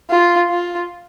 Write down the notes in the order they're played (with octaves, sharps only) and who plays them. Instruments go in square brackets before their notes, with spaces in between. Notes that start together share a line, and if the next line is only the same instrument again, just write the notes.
[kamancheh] F4
F4